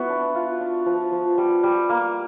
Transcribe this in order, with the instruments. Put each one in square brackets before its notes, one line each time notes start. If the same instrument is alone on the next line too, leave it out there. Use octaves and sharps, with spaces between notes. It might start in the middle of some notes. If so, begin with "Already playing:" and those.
Already playing: [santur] B3 E4 F#4
D4
F4
D4
F3
F3
G3
G3
A#3